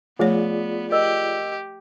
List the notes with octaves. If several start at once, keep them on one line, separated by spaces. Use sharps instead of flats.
F3 A3 B3 F4 G#4 C#5 D5
G4 A#4 D#5 E6